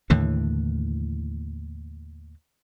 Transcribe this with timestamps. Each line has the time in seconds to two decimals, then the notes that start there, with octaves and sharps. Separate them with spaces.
0.10 D#2 A2 D3 E3